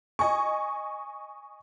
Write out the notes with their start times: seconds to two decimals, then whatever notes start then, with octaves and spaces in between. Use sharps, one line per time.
0.19 D#5 G#5 C#6